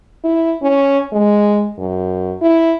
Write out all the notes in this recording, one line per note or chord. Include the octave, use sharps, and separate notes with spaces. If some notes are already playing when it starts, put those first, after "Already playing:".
E4
C#4
G#3
F#2
E4